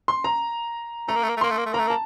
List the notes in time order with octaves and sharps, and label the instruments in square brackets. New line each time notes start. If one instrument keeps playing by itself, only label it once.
[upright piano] C6
A#5
[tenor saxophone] A3 [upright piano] A#5
[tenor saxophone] A#3
A3
A#3
A3
[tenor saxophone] A#3 [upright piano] C6
[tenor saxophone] A3
A#3
A3
[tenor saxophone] A#3 [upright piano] A#5
[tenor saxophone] A3
A#3
[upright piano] A5